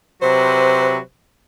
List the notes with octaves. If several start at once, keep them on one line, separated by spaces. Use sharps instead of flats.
C3 F#3 B4 C5